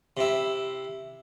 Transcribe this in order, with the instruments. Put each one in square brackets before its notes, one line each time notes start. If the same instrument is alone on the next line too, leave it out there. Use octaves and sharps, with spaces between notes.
[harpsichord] C3 E4